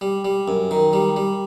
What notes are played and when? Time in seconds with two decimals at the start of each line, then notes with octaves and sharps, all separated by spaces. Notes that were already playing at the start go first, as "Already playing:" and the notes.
0.01 G3
0.25 G3
0.48 F#2
0.71 D#3
0.93 G3
1.16 G3